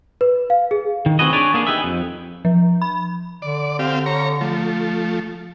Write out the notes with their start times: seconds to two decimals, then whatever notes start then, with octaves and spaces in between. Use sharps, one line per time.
0.21 B4
0.50 F5
0.71 G#4
1.06 D#3
1.19 D2 C4 F#4 G#4 B4 D#5
1.32 D4 G#4 B4 C#5 D5
1.54 A#3 B3 D4 G#4
1.67 D#4 G4 G#4 B4 E5
1.84 F2
2.45 F3
2.82 B5
3.42 D3 D5
3.79 C4 G4 F5
4.06 C#5 A#5
4.41 F3 A3